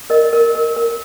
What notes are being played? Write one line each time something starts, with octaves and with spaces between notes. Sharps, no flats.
A#4 D#5
A#4
A#4
A#4